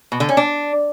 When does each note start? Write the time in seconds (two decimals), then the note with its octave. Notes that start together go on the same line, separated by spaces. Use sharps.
0.12 B2
0.20 D3
0.29 C#4
0.37 D4